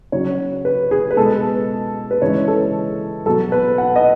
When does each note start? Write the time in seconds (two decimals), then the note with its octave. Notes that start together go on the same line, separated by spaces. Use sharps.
0.12 C#3 F#3 C#5
0.65 B4
0.91 G#4
1.11 B4
1.17 B2 G#3 A4
2.11 B4
2.22 C#3 E3 G#3 C#5
2.48 A4
3.26 B2 F#3 A4
3.52 B4
3.78 F#5
3.96 D#5